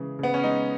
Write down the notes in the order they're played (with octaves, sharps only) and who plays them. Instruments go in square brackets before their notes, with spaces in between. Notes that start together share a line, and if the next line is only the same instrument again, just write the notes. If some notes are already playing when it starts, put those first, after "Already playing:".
Already playing: [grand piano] C#3 E3 G#3
C#3 B3
C#4
G#3 D#4